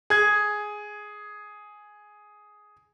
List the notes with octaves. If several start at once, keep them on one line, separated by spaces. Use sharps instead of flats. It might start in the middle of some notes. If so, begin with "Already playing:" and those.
G#4 G#6